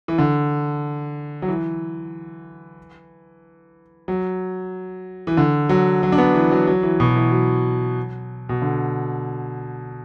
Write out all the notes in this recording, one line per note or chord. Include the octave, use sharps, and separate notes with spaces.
E3
D3
F#3
E3
F#3
E3
D3
F#3
F#3
D4
B3
E3
F#3
F#3
E3
B2
E3
F#3
B2
D3